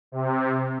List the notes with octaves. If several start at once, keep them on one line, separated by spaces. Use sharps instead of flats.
C3